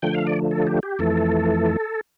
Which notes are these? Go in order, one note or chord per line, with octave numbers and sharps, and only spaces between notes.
D3 F3 A3 G5
F5
D5
A4
G4
G4
F2 E3 A3 A4